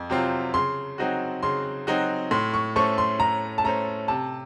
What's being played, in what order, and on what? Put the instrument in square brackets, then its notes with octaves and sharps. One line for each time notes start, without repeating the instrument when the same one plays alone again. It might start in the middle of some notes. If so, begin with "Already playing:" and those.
Already playing: [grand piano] F2
C3 F#3 C4 F4
[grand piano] C#3 [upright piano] C6
[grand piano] F#3 C4 D#4 F#4
[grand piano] C#3 [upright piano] C6
[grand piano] F#3 C4 D#4 F#4
[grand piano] A2 [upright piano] C6
[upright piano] C#6
[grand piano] A3 C#4 A4 C5 [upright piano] C#6
[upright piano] C6
[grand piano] A2 [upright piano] A#5
[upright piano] A5
[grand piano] A3 C#4 A4 C5 [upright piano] A#5
[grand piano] C3 [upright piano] A5